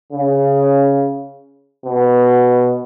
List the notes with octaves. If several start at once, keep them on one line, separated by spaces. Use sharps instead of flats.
C#3
B2